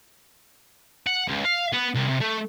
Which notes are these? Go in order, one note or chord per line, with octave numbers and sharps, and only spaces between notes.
F#5
C#2
F5
B3
C2
C3
A3